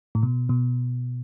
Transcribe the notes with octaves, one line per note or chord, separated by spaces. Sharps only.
A2
B2
B2